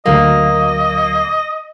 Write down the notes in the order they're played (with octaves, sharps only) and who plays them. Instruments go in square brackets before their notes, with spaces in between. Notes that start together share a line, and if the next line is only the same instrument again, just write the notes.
[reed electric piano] D2 F#3 [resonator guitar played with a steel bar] A#3 [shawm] D#5